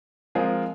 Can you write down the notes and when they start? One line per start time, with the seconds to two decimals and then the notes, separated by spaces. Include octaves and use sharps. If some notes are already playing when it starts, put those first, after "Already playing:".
0.35 F3 G#3 C4 F4 A#4